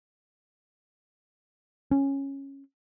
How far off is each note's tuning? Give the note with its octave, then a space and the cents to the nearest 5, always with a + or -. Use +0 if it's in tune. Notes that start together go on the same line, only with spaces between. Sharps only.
C#4 -10